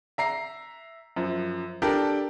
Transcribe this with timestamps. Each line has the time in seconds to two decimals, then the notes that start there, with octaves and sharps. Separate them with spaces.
0.18 E5 A#5 C7
1.16 F#2 F3
1.82 D4 G4 A4 A#4